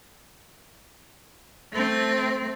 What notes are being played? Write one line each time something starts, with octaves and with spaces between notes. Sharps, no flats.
A3 C4